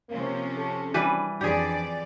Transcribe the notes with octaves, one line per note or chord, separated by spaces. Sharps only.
C3 F3 A#3 C#4
A4
E3 G3 D4 B4
F2 E3 D4 G4 G#4 D5